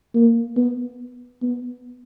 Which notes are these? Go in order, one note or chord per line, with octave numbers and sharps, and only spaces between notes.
A#3
B3
B3